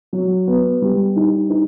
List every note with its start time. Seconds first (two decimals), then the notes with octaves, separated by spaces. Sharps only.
0.13 F#3
0.47 B3
0.82 G3
1.16 D#4
1.50 D#4